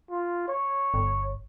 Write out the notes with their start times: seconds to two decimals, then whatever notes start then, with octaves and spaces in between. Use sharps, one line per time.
0.10 F4
0.48 C#5
0.94 G1